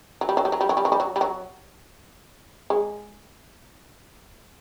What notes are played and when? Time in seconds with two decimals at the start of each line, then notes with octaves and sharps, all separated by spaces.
0.21 F#3
0.29 G3
0.37 F#3
0.45 G3
0.52 F#3
0.61 G3
0.69 F#3
0.77 G3
0.85 F#3
0.92 G3
1.00 F#3
1.16 G3
1.21 F#3
2.70 G#3